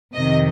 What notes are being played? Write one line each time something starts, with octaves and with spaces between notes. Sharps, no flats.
F2 C3 D#3 D#5